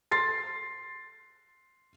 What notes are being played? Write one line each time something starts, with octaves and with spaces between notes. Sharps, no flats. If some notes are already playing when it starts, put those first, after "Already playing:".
C6 A6 C7